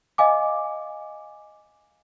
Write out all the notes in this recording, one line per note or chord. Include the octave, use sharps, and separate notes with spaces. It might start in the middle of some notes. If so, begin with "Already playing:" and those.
D#5 F5 G#5 D6